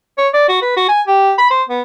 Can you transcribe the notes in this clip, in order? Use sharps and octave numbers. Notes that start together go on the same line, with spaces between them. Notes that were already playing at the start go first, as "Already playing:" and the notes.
C#5
D5
F#4
B4
F#4
G#5
G4
B5
C5
B3